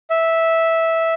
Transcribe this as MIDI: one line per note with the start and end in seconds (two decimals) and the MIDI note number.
0.10 1.14 76